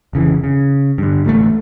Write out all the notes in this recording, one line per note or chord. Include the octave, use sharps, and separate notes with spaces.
F1 C#3 E3
C#3
G2 D3
A1 D2 G3 A3